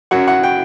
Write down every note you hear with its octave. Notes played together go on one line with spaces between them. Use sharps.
F#2 F#3 F#5
F#5
G5